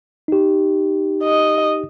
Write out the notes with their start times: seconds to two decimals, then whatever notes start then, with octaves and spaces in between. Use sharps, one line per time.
0.28 D#4 G4
1.24 D#5